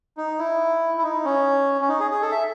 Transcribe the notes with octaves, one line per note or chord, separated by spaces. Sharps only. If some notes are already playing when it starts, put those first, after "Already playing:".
D#4
E4
E4
D#4
C#4
C#4
D#4
G#4
G#4
A4
E5